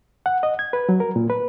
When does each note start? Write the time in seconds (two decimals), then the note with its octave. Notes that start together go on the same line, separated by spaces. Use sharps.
0.26 F#5
0.43 D#5
0.59 G#6
0.73 B4
0.89 F#3
1.00 A#4
1.16 A#2
1.30 B4